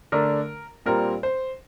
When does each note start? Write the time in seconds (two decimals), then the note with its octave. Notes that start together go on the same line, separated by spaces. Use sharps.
0.12 D3 A3 D4 A#4
0.86 A#2 G3 C4 A#4
1.23 C5